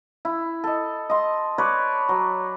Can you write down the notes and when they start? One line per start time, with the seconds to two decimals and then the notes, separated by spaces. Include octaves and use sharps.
0.25 E4
0.64 A4 D#5
1.10 D#5 C6
1.58 B4 C#5 D5
2.09 F#3